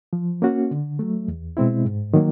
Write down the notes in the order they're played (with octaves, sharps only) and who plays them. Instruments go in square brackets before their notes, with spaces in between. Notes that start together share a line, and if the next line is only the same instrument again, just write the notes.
[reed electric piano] F3
A#3 C#4 F#4
D3
F#3 A3
E2
B2 G#3 C4 E4
G#2
D#3 F#3 A#3